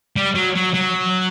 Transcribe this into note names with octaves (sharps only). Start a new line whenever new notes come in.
G3
F#3
F#3
F#3